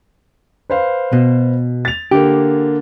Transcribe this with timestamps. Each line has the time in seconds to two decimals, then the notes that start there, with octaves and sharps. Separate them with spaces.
0.70 B4 C5 F5
1.13 B2
1.85 A6 F7
2.11 D3 A#3 G4